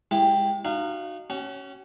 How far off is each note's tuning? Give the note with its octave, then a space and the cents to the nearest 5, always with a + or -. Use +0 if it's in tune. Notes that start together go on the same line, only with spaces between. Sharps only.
G#3 -25 E4 +5 G4 +0
D#4 -30 F#4 +0 F5 -25
C#4 +0 F#4 +40